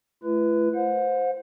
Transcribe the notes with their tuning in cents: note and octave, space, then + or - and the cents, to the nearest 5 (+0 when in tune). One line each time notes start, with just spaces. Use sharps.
A3 -25 E4 +45 B4 +0
C5 +0 F#5 -40